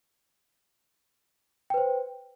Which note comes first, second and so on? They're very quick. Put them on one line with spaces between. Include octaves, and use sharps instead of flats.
G5 B4 C5